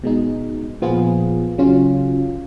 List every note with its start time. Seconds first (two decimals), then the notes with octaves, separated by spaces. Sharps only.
0.04 B2 G#3 D#4
0.82 A#2 F3 B3 F4 G#4
1.58 C#3 F#3 C#4 F4